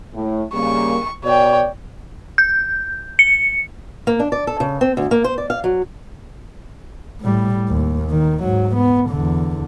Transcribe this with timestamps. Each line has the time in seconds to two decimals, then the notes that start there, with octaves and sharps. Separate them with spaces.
0.14 A2
0.54 C#3 G3 A#3 C#6
1.24 B2 C#5 D5 G5
2.38 G6
3.19 C#7
4.07 A#3
4.20 D4
4.32 D5
4.47 A4
4.60 C#3
4.81 C4
4.97 D2
5.11 A#3
5.24 C5
5.38 D5
5.50 F5
5.64 F#3
7.21 A2 G3
7.69 D#2
8.10 D#3
8.43 G#2 F#3
8.76 B3
9.11 E2 D3